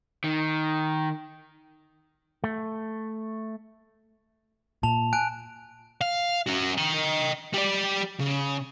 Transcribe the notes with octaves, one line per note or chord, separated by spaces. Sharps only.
D#3
A3
A#2 A5 F7
G#5 F#6 D7
F5
C#4 F#4
D#5 G5
G3 D5
C#3